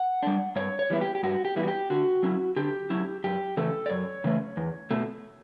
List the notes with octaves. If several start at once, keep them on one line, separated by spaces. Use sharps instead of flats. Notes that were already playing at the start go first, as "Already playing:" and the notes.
Already playing: F#5
G3 D4
G2 C#5
C#5
E3 G3 B3 E4
G4
G4
G2 F#4
G4
E3 G3 B3 E4
F#4
G4
D3 F#4
F#3 C#4 E4
D3 G4
F#3 C#4 E4
F#2 G4
C#3 E3 A3 C#4 A4
D5
F#2 C#5
C#3 E3 A3 C#4
E2
B2 A3